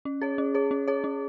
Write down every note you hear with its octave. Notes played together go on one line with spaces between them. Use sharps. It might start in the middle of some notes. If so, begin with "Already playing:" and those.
C#4
G#4 C#5
C#4
G#4 C#5
C#4
G#4 C#5
C#4